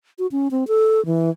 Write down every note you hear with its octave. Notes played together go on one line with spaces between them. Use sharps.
F#4
C#4
C4
A4
E3